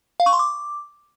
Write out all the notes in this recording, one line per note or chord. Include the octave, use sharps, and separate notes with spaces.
F5
C#6
C6
D6